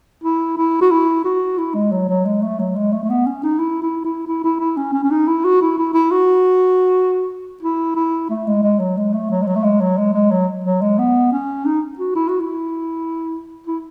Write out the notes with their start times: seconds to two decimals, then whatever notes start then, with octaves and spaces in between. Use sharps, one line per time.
0.24 E4
0.57 E4
0.81 F#4
0.91 E4
1.24 F#4
1.58 E4
1.74 G#3
1.92 F#3
2.09 F#3
2.25 G#3
2.42 A3
2.59 F#3
2.76 G#3
2.92 A3
3.03 A3
3.10 B3
3.26 C#4
3.43 D#4
3.59 E4
3.82 E4
4.04 E4
4.27 E4
4.44 E4
4.60 E4
4.77 C#4
4.93 C#4
5.04 C#4
5.11 D#4
5.28 E4
5.45 F#4
5.61 E4
5.78 E4
5.94 E4
6.11 F#4
7.62 E4
7.95 E4
8.29 A3
8.47 G#3
8.63 G#3
8.79 F#3
8.97 G#3
9.13 A3
9.30 F#3
9.42 G#3
9.47 F#3
9.55 A3
9.64 G#3
9.81 F#3
9.98 G#3
10.13 G#3
10.31 F#3
10.64 F#3
10.81 G#3
10.98 B3
11.32 C#4
11.65 D#4
11.99 F#4
12.15 E4
12.28 F#4
12.40 E4
13.67 E4